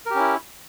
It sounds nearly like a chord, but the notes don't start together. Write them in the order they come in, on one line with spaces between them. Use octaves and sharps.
A#4 G4 C#4 E4